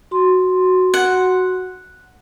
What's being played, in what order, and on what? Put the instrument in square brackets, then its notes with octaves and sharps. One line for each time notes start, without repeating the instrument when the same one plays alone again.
[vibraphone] F#4 C6
[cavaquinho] F#5